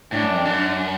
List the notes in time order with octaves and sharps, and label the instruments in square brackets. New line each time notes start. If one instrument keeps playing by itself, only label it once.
[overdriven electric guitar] A2 [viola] D4
[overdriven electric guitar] F#2
F2
F#2